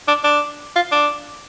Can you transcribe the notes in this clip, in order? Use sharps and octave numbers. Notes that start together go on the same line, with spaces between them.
D4
D4
F4
D4